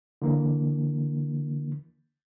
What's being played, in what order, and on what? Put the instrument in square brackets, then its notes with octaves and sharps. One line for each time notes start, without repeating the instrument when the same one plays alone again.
[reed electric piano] D3 E3 A#3